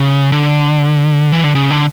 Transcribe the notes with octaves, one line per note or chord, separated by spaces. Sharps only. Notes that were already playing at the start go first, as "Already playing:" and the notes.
Already playing: C#3
D3
E3
D3
C#3
D3